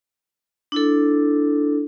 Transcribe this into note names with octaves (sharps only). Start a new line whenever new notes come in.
D4 E4 A4